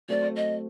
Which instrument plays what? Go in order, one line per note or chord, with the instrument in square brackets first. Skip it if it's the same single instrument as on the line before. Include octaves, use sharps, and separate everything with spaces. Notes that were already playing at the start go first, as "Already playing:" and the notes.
[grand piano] F#3 A3 C4 [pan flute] D5
[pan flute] D#5